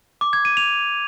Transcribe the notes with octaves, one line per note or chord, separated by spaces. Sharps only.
D6
G#6
D#7
F7